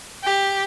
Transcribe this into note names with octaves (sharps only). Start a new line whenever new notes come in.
G4